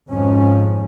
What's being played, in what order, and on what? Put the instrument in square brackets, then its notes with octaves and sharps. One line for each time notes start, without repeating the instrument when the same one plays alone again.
[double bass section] G#1 F2 G#2 F3 C#4